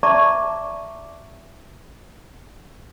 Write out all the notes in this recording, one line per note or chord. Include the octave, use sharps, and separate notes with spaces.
D5 E5 A5 A#5 C#6 D6